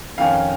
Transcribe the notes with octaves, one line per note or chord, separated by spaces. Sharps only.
F2 D#3 C#4 F5